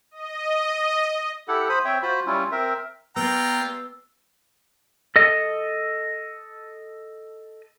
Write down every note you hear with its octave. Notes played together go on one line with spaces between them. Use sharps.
D#5
E4 G4 A4 F#5
C5 B5 D#6
C4 C#5 E5 G5
F4 F#4 C5 B5
G3 C#4 E4 F4
C4 A#4 E5
G3 G#3 B3 F4 G5 A#5 E6
A4 D#5